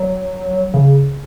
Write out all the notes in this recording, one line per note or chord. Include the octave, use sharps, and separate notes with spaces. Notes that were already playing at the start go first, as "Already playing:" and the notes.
Already playing: F#3
C#3